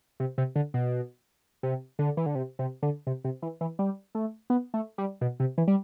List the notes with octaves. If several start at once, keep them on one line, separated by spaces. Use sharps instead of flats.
C3
C3
D3
B2
C3
D3
E3
D3
C3
C3
D3
C3
C3
E3
E3
G3
A3
B3
A3
G3
B2
C3
E3
G3